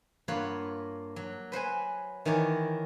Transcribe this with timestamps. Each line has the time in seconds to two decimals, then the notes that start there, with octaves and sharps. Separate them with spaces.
0.28 G2 A#3 F4 C#5 F#5 B5
1.16 F#3
1.52 B4 C5 F#5 G#5
2.25 D#3 E3 A#4 C#5 D5